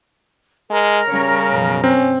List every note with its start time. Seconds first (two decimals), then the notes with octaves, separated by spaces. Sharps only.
0.70 G#3 A#4
1.08 C#3 G3 C#4 C#5
1.49 F#2 B2 F3
1.84 C4 C#4